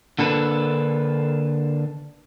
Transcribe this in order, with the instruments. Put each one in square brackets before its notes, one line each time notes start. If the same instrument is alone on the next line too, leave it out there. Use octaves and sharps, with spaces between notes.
[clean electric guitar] D3 A#3 D4 A4 B4